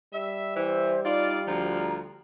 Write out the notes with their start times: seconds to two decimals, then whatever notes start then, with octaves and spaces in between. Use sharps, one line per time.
0.13 G3 E5
0.55 E3 C5 E5
1.04 D#4 F4 D5
1.47 D2 D3 F3 A#5